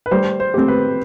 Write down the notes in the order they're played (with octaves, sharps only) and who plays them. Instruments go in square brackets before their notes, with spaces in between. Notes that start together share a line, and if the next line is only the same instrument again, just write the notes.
[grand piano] B4
[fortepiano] G3 [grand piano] C5
[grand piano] C5
[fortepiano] C4 G4
[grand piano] B4